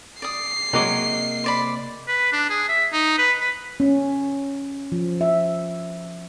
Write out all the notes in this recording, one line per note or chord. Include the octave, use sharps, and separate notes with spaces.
D5 D#6 C7
C3 F#3 G#3 A#3 D#5 D6
C5 D5 B5
B4
D4
G#4
E5
D#4
B4
B4
C#4
F3
E5